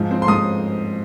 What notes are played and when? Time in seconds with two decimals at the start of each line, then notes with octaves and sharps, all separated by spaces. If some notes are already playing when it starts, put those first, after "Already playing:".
Already playing: G#2 F3
0.11 C4
0.22 C6
0.28 G#2 D#6